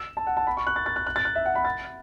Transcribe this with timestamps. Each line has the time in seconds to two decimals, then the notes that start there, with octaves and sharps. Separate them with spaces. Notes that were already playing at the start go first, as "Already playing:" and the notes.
Already playing: E6
0.17 A5
0.27 F#5
0.37 A5
0.47 B5
0.57 C#6
0.67 F#6
0.76 A6
0.86 A6
0.96 F#6
1.07 F#6
1.16 A6
1.25 F#6
1.35 E5
1.46 F#5
1.55 B5
1.65 A6